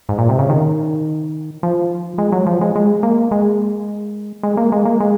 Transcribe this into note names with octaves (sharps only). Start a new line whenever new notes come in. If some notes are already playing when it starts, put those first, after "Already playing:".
G#2
A#2
C3
C#3
D#3
F3
G#3
F#3
F3
G#3
G#3
A#3
G#3
G#3
A#3
G#3
A#3
G#3